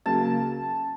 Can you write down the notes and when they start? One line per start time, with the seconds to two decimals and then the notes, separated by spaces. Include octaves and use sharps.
0.06 C#3 F#3 A#3 A5